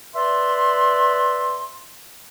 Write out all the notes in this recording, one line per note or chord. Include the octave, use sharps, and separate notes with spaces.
B4 D5 E5 C6